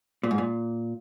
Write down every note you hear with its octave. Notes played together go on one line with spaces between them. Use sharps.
A#2
G#2
A#2